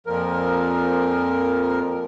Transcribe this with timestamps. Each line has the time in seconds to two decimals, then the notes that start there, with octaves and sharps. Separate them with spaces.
0.07 F2 A#2 F3 A#4